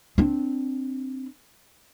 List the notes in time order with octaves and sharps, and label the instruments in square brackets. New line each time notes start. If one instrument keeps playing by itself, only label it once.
[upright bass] C4 D4